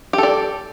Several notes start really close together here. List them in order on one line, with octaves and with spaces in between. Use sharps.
G4 A4 D5